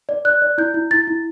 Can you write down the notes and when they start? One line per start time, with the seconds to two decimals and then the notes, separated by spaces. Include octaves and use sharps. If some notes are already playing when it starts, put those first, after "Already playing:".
0.09 D5
0.25 D5 F#6
0.42 D5
0.58 E4 G6
0.74 E4
0.91 E4 A6
1.07 E4